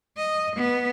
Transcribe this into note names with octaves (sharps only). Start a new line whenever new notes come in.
D#5
B3